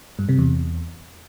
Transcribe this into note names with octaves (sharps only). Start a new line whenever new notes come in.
G2
C3
E2